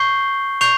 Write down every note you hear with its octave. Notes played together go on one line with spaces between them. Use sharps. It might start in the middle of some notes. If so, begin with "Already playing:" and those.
Already playing: C#6 G6 C7 G7
C#6 G6 C7 F7